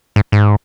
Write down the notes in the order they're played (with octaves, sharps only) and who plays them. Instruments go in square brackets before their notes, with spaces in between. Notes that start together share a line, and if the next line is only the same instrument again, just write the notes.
[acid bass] G#2
G#2